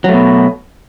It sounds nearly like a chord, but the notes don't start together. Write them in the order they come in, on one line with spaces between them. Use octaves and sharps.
F#3 A3 B2